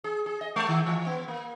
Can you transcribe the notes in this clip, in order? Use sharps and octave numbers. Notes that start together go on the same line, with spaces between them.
G#4
G#4
D#5
G#3
D#3
E3
B3
A#3